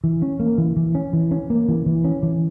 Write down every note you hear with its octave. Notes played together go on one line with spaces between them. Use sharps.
E3
C#4
A#3
E3
E3
C#4
E3
C#4
A#3
E3
E3
C#4
E3